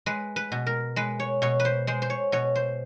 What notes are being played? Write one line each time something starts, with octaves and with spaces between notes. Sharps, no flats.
G#3 B4
B4
B2
A#4
G#3 B4
C#5
B2 C#5
B4
C5
G#3 C5
C5
C#5
B2 C#5
C5